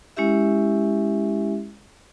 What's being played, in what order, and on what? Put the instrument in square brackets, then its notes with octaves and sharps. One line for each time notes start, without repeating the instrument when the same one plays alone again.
[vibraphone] G#3 C#4 E4 G4 E5